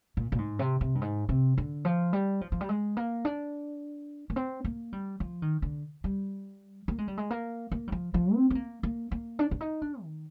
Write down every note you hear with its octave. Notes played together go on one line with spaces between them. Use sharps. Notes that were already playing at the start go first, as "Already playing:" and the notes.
A#2
A#2
G#2
C3
C3
G2
G#2
C3
D3
F3
G3
F3
F3
G3
G#3
A#3
D4
A#3
C4
A#3
G3
F3
D#3
D3
G3
A#3
G#3
G3
G#3
A#3
A#3
G3
F3
F3
C4
C4
A#3
A#3
A#3
D4
D4
D#4
D4
D#3